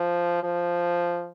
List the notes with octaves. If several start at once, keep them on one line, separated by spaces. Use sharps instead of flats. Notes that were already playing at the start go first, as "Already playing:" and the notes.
Already playing: F3
F3